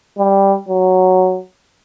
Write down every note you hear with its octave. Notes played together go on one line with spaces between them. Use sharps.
G3
F#3